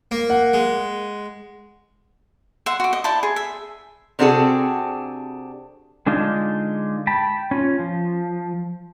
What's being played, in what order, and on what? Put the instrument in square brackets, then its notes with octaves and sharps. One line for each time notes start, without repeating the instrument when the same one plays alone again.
[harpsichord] A#3
[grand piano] F#5
[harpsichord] G#3
[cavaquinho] E5 F#5 C6
F#4 D6
D#5
E4 C5 D5 A5
G#4
E5
[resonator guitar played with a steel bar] C3 C4 D4 F#4 G#4 A4
[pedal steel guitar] D3 G#3 D4 D#4 F4
G5 A5 B5
C#4 F4
F3